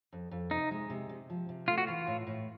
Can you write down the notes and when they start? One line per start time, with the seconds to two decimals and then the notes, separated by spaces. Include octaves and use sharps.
0.13 F2
0.31 F2
0.51 C3 D#4
0.71 G#3
0.90 C3
1.09 C3
1.30 F3
1.49 C3
1.68 A3 F4
1.78 F#4
1.87 E3 F4
2.07 A2
2.27 A2